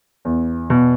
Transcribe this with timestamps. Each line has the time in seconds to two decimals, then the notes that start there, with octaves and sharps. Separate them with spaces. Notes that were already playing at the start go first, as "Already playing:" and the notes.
0.25 E2
0.70 B2